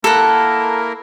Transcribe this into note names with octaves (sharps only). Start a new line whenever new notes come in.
A#3 E4 A4 A#4 F#5